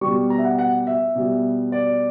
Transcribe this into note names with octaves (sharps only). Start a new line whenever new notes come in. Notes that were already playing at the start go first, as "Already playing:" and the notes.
B2 G3 C#6
A#5
E5
F#5
F#5
E5
B2 G3
D5